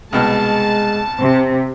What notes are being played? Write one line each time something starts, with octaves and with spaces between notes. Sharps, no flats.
C2 B2 G#3 A5 F6
C3 C4